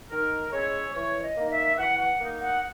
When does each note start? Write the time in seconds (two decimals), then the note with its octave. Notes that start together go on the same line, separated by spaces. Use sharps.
0.11 D#3 A#4
0.52 G#3 C#4 E4 C#5
0.94 E3 C#5
1.23 D#5
1.37 A#3 D#4
1.51 E5
1.78 E3 F#5
1.99 F#5
2.20 A#3 D#4
2.41 F#5